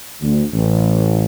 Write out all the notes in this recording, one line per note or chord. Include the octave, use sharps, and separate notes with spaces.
D2
A1